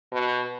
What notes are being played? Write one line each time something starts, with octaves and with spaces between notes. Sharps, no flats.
B2